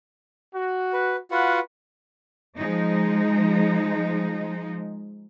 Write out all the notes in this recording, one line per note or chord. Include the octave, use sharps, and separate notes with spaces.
F#4
B4
F4 F#4 B4 F#5
F3 G#3 D#4